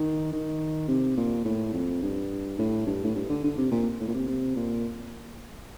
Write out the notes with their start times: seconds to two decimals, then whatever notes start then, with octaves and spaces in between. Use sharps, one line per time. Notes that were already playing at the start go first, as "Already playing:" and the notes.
Already playing: D#3
0.32 D#3
0.88 C3
1.17 A#2
1.45 A2
1.73 F2
2.02 G2
2.59 A2
2.86 G2
3.04 A2
3.15 G2
3.29 D3
3.44 D3
3.58 C3
3.71 A#2
4.00 A2
4.08 A#2
4.14 C3
4.28 C3
4.56 A#2